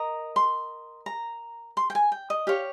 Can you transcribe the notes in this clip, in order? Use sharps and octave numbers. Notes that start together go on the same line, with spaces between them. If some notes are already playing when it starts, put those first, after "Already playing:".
Already playing: A#4 D#5 A#5
C6
A#5
C6
G5
G#5
G5
D#5
G4 C#5 F5